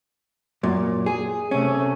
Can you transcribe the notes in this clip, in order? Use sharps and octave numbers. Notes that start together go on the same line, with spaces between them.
F#2 A#2
G#4
C3 A3 C#4